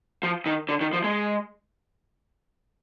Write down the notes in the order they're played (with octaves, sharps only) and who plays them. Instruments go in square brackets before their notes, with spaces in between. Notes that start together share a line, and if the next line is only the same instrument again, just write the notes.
[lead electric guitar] F3
D#3
D3
D#3
F3
G#3